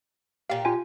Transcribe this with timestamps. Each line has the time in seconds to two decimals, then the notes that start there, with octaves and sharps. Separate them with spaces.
0.50 A#2 G4 F5
0.65 F4 G#5